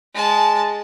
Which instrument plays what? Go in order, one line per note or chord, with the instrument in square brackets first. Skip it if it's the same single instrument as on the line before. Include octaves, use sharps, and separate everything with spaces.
[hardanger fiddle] G#3 A5